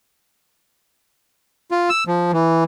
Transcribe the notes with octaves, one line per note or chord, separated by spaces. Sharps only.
F4
E6
F3
E3